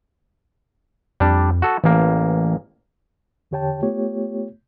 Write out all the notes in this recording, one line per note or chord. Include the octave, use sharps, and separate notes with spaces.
F2 G3 D4
F#4 A4
A1 E3 A#3
E2 D3 G4 C#5 G5 A5
A3 B3 F4 G4 C#5